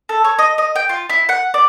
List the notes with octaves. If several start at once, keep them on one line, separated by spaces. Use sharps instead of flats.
A4
C#5
D#5
D#5
G5
F4
E4
F#5
D5